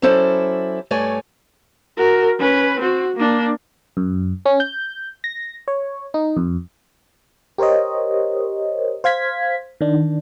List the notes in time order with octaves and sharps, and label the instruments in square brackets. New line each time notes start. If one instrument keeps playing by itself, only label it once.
[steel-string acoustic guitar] F#3 C#4 E4 A4 C5 D5
G2 A3 C#5 D5 G#5
[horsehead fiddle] F#4 A#4
C#4 B4
C4 F#4
A#3 D4
[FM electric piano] F#2
C#4
G6
A#6
C#5
D#4
F2
G4 A#4 C5 C#5 D#5
C5 F5 G#6 B6
D#3 D4